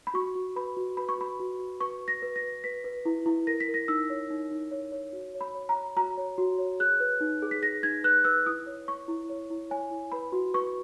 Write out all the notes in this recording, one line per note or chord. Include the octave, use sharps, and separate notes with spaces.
B5
F#4 C#6
F#4
B4 B5
F#4
B4 B5
C#6
F#4 B5
F#4
F#4
B4 C#6
B4
A#6
B4
A#6
B4
B4 B6
B4
E4
E4
A#4 A#6
B6
A#4
A#6
D#4 E6
C#5
D#4
D#4
C#5
C#5
F#4
C#5
B5
C#5
A#5
C#5
F#4 A#5
C#5
F#4
C#5
G#4 F#6
B4
D#4
G#4
B6
G#4 A#6
D#4 G#6
B4 F#6
B4 E6
E4 D#6
C#5
C#5 C#6
E4
C#5
E4
C#5 G#5
E4
B4 B5
F#4
B4 C#6